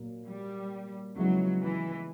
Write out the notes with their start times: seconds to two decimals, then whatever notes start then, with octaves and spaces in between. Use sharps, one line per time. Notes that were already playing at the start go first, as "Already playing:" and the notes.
Already playing: A#2 F#3 A#3
0.26 G3
1.15 C#3 F3 F#3 G#3 B3 E4
1.60 E3